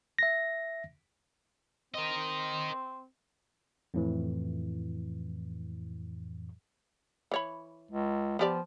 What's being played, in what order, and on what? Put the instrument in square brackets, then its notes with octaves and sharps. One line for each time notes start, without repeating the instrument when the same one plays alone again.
[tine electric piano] E5 A#6
[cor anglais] C4 [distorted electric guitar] A#4 D#5
[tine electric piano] F2 A2 E3
[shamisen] E3 C#5 B5
[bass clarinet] C#2
[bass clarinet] F3 [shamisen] B3 G4 D5